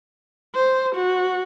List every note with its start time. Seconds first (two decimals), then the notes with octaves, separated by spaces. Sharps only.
0.55 C5
0.95 F#4